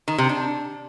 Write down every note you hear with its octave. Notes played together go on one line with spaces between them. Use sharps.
D#3
C3
D4